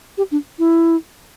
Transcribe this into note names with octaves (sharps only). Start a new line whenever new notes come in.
G4
D4
E4